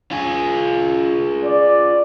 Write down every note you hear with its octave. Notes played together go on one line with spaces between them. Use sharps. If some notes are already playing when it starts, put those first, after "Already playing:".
F4 G#4
D5